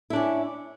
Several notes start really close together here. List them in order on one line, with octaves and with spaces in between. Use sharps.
E4 D4 C#4